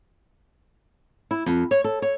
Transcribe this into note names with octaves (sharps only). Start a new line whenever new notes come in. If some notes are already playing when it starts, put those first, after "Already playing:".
E4
F2
C#5
A4
C#5